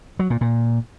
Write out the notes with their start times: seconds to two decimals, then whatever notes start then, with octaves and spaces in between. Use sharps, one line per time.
0.19 F#3
0.30 A#2
0.41 A#2